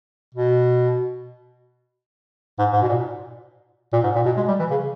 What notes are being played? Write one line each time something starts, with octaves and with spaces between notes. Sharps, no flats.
B2
G#2
G#2
B2
A#2
A#2
G#2
A#2
B2
G#3
G3
E3
C#3